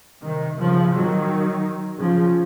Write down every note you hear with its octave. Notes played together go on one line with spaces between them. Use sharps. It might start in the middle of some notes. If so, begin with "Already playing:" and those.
C3 D#3
C#3 F3
D#3 F#3
C#3 F3